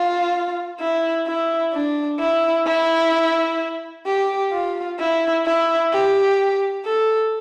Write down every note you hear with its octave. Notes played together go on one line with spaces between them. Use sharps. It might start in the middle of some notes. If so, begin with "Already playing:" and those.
Already playing: F4
E4
E4
D4
E4
E4
G4
F4
E4
E4
G4
A4